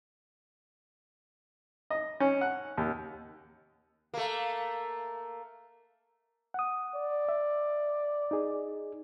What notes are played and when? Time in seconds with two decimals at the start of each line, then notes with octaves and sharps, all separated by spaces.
1.90 D#5
2.20 C#4
2.41 F#5
2.78 D#2
4.14 A3 A#3
6.54 F#5 D#6
6.94 D5
7.29 E5
8.31 D#4 G#4